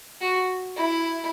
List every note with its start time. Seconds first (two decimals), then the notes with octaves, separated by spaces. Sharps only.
0.21 F#4
0.76 E4